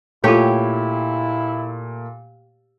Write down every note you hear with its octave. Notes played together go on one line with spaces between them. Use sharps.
A#2 A3 E4 F4 G4 A4 C#5